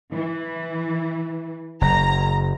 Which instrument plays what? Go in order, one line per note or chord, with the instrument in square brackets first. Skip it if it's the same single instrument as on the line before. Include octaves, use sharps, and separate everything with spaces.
[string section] E3
[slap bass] F#1 [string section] A#5